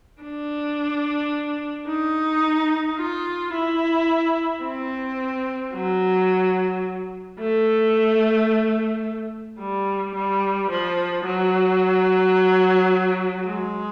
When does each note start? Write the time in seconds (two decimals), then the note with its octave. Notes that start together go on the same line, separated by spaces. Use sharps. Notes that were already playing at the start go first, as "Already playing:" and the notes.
0.23 D4
1.88 D#4
2.98 F4
3.53 E4
4.64 C4
5.74 F#3
7.39 A3
9.60 G3
10.15 G3
10.70 F3
11.25 F#3
13.46 G#3